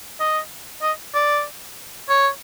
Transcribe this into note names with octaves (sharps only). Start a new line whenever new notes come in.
D#5
D#5
D5
C#5